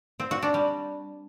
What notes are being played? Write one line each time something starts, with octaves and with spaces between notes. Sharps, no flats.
C4
F#4
D4
G3